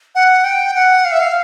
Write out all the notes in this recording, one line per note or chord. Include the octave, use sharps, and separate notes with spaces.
F#5
G5
F#5
F5
E5
F5